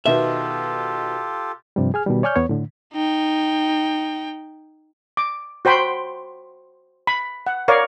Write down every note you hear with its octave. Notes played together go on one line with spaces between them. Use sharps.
B2 D#3 B3 F4 G4 A4 E5
G2 C3 F3 G3
G#4 G#5 F6
B2 D#3 G3
C#5 D5 G#5 C#6 F6 G6
E2 B3 C#5
A2 D3
D#4 G5
D6
F#4 C5 G5 B5 C6
B5
F#5
A#4 C#5 D5 F5